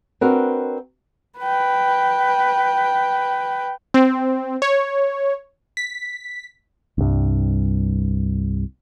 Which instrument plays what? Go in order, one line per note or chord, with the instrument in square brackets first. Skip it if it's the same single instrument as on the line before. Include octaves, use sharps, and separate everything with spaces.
[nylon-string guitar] C4 D4 F#4 A#4 B4
[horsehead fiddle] B4 G5
[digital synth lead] C4
C#5
B6
[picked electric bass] C2 G2